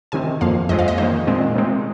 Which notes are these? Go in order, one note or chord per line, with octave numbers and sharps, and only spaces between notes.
C3 D#3 C4 G#5
F2 F3 A#3 F5
F2 F3 G#3 C4 D#5
F5
D#5
G#2 D#3 A#3 C5
A#2 G#3 C4
C3 D#3 G#3 C4